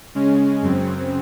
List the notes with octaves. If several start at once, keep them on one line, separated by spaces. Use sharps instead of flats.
C#3 G#3 C#4
F#2 C#3 F#3 C4